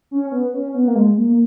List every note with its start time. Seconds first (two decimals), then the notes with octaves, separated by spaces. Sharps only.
0.11 C#4
0.32 B3
0.54 C#4
0.74 B3
0.87 A#3
0.96 G#3
1.17 A#3